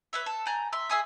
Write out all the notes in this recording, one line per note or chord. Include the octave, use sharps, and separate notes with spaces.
B4 C#5 E5
A4
D5 G#5 A#5 G6
E5 C6
G#4 E5 G#5 D#6